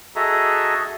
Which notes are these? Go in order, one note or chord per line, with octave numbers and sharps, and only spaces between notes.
F#4 G#4 A4 D#5 E5 A#5